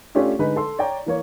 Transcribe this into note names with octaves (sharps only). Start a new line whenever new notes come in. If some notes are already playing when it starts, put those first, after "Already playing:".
A3 C#4 D4 F4 G4
D3 G#3 D#4 B4
A4 C6
C#5 D5 G5 A#5
E3 A#3 C#5